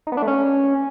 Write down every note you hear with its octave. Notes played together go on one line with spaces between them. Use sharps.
D#4
B3
D4
A3
C#4